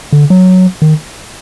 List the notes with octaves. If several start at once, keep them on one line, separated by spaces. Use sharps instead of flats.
D3
F#3
D#3